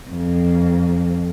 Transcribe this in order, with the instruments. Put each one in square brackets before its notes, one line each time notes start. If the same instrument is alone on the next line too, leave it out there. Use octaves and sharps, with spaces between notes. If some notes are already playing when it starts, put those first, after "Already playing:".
[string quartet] F2